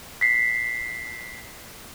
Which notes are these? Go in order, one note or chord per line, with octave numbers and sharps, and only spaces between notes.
B6 C7